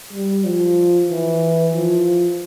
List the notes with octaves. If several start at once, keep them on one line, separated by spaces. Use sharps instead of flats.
G3
F3
E3
F3